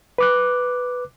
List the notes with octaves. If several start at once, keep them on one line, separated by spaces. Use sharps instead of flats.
B4 D6 F#6